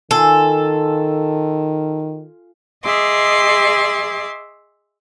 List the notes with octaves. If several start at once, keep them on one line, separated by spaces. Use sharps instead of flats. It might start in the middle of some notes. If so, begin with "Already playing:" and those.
D#3 F4 A4 G#5 C6
G#4 D#5 E5 C6 D6